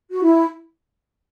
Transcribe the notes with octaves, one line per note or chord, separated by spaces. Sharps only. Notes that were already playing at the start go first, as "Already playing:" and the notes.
F#4
E4